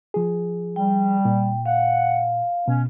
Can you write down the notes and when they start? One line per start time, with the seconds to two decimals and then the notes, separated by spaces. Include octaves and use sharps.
0.14 F3 G#4
0.76 G3 G5
1.25 A#2
1.66 F5 F#5
2.68 B2 C#4